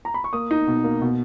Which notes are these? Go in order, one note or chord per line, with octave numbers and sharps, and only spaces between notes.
A#5
B5
C#6
A#3 D#6
D#4
B2
A#3
B2